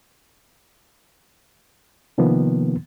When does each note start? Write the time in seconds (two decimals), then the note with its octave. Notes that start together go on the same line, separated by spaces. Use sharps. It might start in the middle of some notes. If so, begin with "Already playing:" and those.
2.18 C3 D#3 F3 A#3 B3